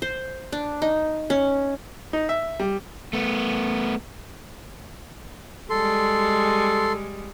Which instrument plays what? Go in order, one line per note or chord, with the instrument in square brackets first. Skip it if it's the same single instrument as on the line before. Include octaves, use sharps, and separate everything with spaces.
[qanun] C5
D4
D#4
C#4
[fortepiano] D#4
E5
G3
[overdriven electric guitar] A3 B3
[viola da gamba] G3 G#3 [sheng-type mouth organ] A4 C6